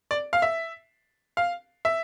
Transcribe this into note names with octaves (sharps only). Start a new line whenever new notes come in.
D5
F5
E5
F5
E5